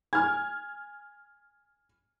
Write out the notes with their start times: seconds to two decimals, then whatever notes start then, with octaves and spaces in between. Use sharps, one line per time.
0.13 G#5 F6 G#6